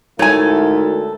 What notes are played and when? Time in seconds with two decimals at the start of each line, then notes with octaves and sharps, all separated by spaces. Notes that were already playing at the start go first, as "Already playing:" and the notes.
0.19 D2 G#2 A3 E4 A4 A#4 C#5 G#5